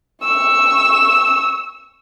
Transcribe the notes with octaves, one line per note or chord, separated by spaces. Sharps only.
C#6 E6